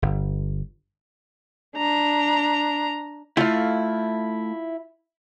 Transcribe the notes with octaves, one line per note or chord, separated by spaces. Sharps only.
G1
D4 A#5
A3 E4 F4 F5